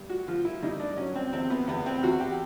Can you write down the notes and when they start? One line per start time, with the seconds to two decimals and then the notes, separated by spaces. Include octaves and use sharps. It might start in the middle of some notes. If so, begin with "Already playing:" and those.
Already playing: G2
0.10 F#4
0.28 F3 F4
0.45 E4
0.63 G2 D#4
0.80 D4
0.97 F#3 C#4
1.15 C4
1.33 E2 C4
1.50 B3
1.67 E2 B3
1.86 C4
2.03 E2 F#4
2.20 G4